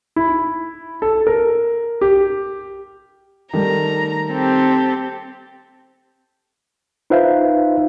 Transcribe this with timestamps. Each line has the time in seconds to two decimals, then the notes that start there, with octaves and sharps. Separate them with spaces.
0.16 E4
1.02 A4
1.27 A#4
2.01 G4
3.53 D#3 G3 A3 A#5
4.30 C4 G4 A4
7.10 D#4 F4 B4 C5 E5 F5